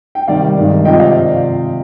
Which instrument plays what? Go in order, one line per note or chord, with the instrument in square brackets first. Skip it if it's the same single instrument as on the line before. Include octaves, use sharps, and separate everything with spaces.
[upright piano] G5
C3 D#3 G3 D5 F5
G2 D#3 G#3
C3 F3 G#3 D#5 G5
D5 F5